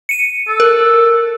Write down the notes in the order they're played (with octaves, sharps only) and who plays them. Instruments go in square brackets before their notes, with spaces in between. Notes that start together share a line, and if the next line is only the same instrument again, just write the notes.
[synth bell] C#7 D#7
[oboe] A4
[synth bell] A#4